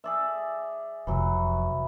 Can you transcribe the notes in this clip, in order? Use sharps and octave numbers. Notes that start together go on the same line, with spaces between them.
G#4 D5 E5
F1 F2 C3 E3 F#3 F#4